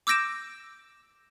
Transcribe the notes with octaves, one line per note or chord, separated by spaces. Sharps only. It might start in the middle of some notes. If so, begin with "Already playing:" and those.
D6 E6 G6 A#6 D7 E7